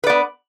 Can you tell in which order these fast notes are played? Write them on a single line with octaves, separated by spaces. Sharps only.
B4 D5 B3